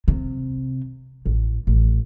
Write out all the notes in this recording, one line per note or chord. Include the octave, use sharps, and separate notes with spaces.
C3
A1
A1